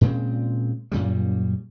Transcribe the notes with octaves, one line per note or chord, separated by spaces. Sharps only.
A#2 C#3 G#3 C4
F#2 A#2 C#3 G3